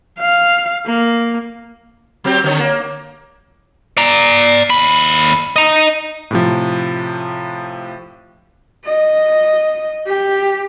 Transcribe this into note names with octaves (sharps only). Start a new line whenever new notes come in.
F5
A#3
F#3 C4 G4
D3 D#3 C#5
A#3
D5 A#5
D#2 B5
D#5 A#5
A2 C3 F3
D#5
G4